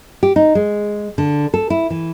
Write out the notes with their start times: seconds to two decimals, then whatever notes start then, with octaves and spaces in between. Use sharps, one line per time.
0.23 G4
0.36 D#4
0.55 G#3
1.18 D3
1.54 A4
1.70 E4
1.90 E3